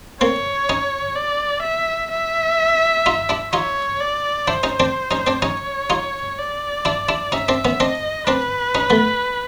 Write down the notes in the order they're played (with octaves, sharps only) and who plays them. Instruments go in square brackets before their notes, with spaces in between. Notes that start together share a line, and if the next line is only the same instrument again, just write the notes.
[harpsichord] A#3 C4 [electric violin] C#5
[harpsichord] C#4 D#4
[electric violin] D5
E5
E5
[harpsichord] D#4 F4
D4 E4
[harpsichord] D#4 F4 [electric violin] C#5
[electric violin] D5
[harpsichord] D4 E4 [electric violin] C5
[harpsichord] C#4 D#4
C4 D4
C#4 D#4
C4 D4
[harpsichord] C#4 D#4 [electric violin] C#5
[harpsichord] D#4 F4
[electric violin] D5
[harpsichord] D4 E4
D4 E4
[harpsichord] C#4 D#4 [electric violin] E5
[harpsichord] C4 D4
B3 C#4
[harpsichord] C4 D4 [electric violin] D#5
[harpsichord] C4 D4 [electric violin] B4
[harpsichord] C#4 D#4
A3 B3